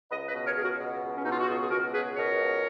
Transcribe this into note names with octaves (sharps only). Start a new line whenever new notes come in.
C#2 B4 D#5
B4 D#5
B2
A#4 C#5
C#2 G#4
F#4 A#4
B2
C#2
C#4
B2 D#4
F4
F#4
C#2 F4 G#4
G#4
B2 F#4 A#4
C#2 G#4 B4
B2 A#4 C#5
C#2